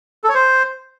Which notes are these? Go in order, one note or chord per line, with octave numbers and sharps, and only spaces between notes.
A4
C#5
C5